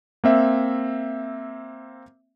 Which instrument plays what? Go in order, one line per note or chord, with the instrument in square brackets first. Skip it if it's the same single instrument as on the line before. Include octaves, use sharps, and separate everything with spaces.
[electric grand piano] A#3 C4 E5